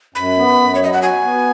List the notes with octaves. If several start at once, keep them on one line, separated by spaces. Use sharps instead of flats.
F#2 B5
B3
F#2
C#5
F#3 D#5
F#5
F#4 G#5
B3